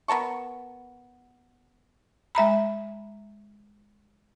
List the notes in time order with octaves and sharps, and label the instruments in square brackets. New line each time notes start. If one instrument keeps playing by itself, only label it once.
[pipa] B3 A#4 A5 C#6
[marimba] G#3 E5 A#5 B5